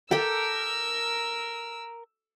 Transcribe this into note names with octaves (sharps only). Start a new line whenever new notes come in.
G4 A4 A#4 G5 E6